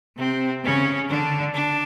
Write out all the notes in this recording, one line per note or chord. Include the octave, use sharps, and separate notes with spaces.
C3 C4
C#3 C#4
D3 D4
D4